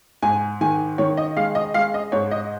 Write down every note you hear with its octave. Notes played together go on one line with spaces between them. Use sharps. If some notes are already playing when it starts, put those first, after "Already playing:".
G#2 G#5
D#3 G#5
D#3 C#5
D#5
G#3 F5
D#5
G#3 F5
D#5
G#2 C#5
D#5